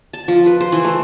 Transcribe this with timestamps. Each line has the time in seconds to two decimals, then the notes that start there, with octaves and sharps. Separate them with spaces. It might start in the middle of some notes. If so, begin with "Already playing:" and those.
0.13 A5
0.28 F3
0.46 B4
0.61 C5
0.72 E3
0.84 A3